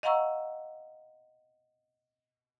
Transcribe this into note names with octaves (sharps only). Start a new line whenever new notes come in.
D#5 F5 F#5 A#5 C#6 E6